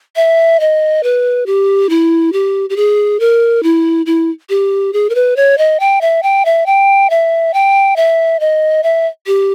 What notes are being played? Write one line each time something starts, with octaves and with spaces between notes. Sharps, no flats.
E5
D#5
B4
G4
E4
G4
G4
G#4
A#4
E4
E4
G4
G#4
A#4
B4
C#5
D#5
G5
E5
G5
E5
G5
E5
G5
E5
D#5
E5
G4